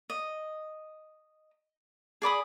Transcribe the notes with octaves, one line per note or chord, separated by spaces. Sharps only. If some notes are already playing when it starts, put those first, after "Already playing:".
D#5
G#4 D5 B5 D#6